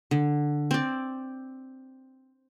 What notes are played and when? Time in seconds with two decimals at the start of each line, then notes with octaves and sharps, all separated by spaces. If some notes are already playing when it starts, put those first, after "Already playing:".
0.11 D3
0.71 C4 D5